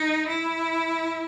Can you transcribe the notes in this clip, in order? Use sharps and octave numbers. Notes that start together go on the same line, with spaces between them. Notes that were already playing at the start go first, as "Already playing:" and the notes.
Already playing: D#4
E4